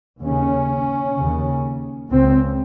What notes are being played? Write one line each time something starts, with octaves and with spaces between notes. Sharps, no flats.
D#2 C#3 C#4
D#2 C#3
C#2 C#3 C4